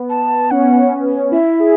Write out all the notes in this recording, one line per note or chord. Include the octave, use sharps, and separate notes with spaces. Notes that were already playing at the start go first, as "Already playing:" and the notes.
Already playing: B3
A5
C#4 F#5
E4 E5
G#4